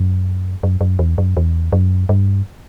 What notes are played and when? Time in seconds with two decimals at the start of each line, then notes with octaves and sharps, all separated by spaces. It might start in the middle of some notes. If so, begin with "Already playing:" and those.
Already playing: F#2
0.63 F#2
0.81 F#2
0.99 E2
1.18 F#2
1.37 E2
1.72 F#2
2.09 G2